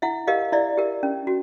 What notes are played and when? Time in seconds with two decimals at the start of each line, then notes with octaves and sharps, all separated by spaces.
0.02 E4 E5 F#5
0.27 G4 A#4 D#5 F5
0.52 E4 D5 E5
0.77 G4 A#4
1.03 C#4
1.27 F#4